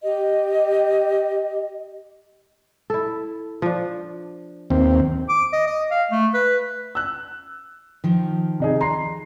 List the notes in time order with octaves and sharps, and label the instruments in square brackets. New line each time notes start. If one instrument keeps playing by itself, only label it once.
[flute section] G4 D#5
[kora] E4 A4
F3 D4
[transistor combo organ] D#2 C4
[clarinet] D6
D#5
D#5
F5
A3
B4
[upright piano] E6 F#6
[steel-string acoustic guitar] D#3 F3
[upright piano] C3 D#4 G#4
A#5 C6 C7